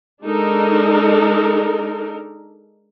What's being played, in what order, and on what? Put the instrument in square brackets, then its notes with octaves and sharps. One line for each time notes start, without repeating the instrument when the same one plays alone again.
[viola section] G#3 D4 D#4 A4 A#4